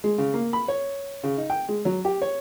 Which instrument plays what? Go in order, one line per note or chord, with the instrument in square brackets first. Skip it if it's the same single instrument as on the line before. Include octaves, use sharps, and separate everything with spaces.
[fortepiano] G#3
C#3
A#3
B5
C#5
C#3
D#4
G5
G#3
F#3
G4
C#5